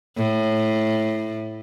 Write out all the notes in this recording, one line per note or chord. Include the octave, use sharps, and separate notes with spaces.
A2